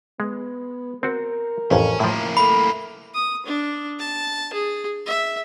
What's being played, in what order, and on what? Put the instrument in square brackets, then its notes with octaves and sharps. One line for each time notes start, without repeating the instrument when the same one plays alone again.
[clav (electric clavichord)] G#3 [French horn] B3
[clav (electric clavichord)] C4 F#4 [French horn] A#4
[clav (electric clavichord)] A1 F2 [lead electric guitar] C#4
[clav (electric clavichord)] A2 F3 [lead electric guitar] A#3 E4
[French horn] A3 [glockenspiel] B5
[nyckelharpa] D#6
D4
A5
G#4
E5